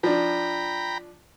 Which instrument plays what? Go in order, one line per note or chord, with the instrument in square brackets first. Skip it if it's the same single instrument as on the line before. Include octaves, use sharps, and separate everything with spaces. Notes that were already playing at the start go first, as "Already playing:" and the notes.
[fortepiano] F3 D4 [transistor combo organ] G5 A#5 B5